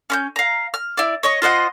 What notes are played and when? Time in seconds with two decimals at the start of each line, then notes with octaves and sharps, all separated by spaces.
0.10 C#4 B5 G6
0.36 F5 A#5
0.74 F6
0.97 E4 D5
1.23 C#5 D#5 C#6
1.42 F4 C5 D#5 F#5